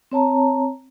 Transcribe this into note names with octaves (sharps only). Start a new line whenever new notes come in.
C4 C#5 A5 A#5